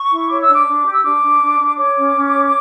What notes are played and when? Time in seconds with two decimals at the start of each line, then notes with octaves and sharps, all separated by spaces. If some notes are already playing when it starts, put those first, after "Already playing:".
Already playing: C#6
0.11 E4
0.30 C#5 D6
0.42 E6
0.48 D4
0.55 D6
0.67 D4
0.86 G4
0.95 E6
1.04 D4 D6
1.23 D4
1.42 D4
1.59 D4
1.78 C#5 D6
1.96 C#4
2.15 C#4
2.35 C#5